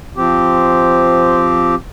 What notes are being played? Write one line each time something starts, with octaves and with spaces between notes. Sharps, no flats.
F3 C4 G4